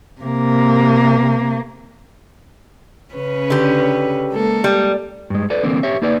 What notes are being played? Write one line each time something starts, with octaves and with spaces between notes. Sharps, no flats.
C3 A#3
C#3 C#4 B4
D3 G4
G#3 A#3 A4
G3
G2 G#3
A4 B4 D5
D3 E3 A#3 C4
G4 C#5 E5
A#3 D#4 B4 D5